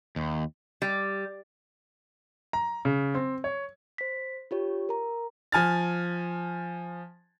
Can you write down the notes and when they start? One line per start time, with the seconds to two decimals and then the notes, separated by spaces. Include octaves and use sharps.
0.16 D#2
0.82 G3
2.53 A#5
2.85 C#3
3.15 C4
3.44 C#5
3.98 C5 B6
4.51 F4 G4 C#5
4.89 A#4 A#5
5.52 F3 G#5 F6 A6